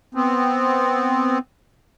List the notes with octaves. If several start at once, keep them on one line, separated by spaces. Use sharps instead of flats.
B3 C4